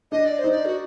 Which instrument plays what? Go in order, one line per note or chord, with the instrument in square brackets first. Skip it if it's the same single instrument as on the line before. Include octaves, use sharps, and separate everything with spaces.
[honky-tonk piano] D4 [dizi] D#5
[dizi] D5
C5
[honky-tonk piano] D#4
[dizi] D5
F#4